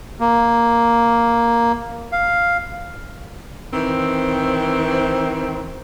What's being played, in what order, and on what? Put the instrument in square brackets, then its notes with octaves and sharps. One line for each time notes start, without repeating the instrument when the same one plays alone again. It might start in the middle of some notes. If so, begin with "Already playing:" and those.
[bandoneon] A#3
F5
[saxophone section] D#3 E3 C4